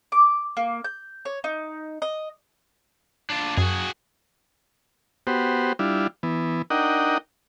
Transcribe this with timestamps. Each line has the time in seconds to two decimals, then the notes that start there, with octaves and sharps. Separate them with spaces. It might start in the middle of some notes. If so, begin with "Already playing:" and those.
0.12 D6
0.57 A#3
0.84 G6
1.25 C#5
1.44 D#4
2.02 D#5
3.30 D4 F4
3.58 F#2 F#4 G#4
5.27 B3 F#4 G4 C5
5.79 G3 D4 E4 F4
6.23 E3 B3
6.70 D4 D#4 A#4 D#5 F#5 G5